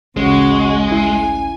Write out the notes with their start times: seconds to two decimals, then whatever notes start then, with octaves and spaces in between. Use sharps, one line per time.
0.17 A1 D2 C#3 G#3 C#4 F#4
0.92 E4 G#5